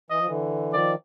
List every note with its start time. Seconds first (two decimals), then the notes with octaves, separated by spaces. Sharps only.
0.10 E3 D#5
0.19 F3
0.27 D3 E3
0.73 D#3 F3 D5